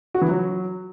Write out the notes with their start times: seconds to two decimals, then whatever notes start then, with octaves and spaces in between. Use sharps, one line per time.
0.14 F#4
0.22 E3
0.29 F#3